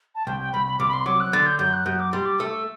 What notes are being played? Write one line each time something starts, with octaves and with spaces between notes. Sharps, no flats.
A5
C2 G5
G5
C2 B5
B5
C2 D6
B5
C6
F#3 D6
F#6
D3 A6
G6
F#2 G6
F#6
F#2 G6
D6
G3 C6
D6
A3 E6